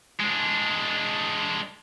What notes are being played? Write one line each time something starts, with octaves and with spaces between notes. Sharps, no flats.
G#3 D4